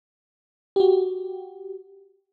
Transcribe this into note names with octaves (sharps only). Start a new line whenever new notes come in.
F#4 G4